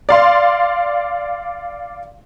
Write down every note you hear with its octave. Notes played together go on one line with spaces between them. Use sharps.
D5 F5 C6